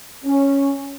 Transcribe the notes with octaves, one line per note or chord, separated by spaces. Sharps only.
C#4